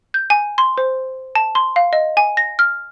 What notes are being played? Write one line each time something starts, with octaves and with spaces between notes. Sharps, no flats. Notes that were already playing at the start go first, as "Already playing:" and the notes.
G6
G#5
C6
C5
A5
C6
F5
D#5
G#5
A#6
F6